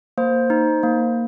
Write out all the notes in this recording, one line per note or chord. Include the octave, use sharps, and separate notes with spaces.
A#3 C5
D#4
A#3